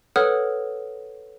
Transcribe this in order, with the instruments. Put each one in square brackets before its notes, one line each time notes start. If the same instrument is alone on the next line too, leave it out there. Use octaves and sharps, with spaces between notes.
[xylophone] A4 B4 C#5 F#5 D#6 F6